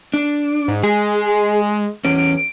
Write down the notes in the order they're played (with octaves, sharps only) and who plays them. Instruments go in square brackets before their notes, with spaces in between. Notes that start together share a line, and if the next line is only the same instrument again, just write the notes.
[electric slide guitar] D4
[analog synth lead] G#2
[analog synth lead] G#3 [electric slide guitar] G#4
[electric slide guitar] E2 C#4 [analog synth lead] D7